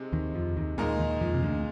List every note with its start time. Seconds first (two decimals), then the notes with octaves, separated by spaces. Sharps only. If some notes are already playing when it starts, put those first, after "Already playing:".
Already playing: C3 G#3 D#4
0.13 D#2 D#3
0.34 F2 F3
0.56 D#2 D#3
0.78 D#2 A#2 D#3 G#3 D#4 A#4 D#5
0.99 D#2 D#3
1.21 F2 F3
1.34 C3
1.43 D2 D3